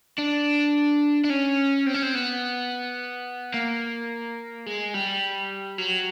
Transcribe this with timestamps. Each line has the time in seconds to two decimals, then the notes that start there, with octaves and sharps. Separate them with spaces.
0.18 D4
1.24 D4
1.30 C#4
1.86 C4
1.94 C#4
2.03 C4
2.15 B3
3.54 A#3
4.66 G#3
4.94 G3
5.78 F#3